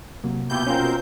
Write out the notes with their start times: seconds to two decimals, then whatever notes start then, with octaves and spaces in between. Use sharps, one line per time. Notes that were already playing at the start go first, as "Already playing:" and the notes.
0.24 C3 F#3 A#3
0.50 B2 E4 F4 G4 G6
0.67 C4 C#4 F4 A#4 C5